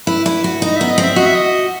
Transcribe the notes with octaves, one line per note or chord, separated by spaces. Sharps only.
E4 B4
E4
F#4
D#4 D#5
B3 E5
D#5
C4
E5
F#4 D#5
E5
D#5